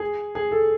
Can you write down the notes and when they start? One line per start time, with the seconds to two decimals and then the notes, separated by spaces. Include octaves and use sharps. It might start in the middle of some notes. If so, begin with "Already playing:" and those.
Already playing: G#4
0.35 G#4
0.51 A4